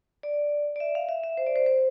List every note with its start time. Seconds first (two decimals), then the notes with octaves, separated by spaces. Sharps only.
0.23 D5
0.76 D5
0.80 E5
0.95 F5
1.09 E5
1.24 E5
1.37 C5
1.46 D5
1.56 C5
1.66 C5